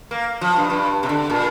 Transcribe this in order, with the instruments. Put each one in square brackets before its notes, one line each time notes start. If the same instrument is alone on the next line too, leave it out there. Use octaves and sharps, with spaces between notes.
[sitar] A#3
F3
G2
G2
C3
D3
A#2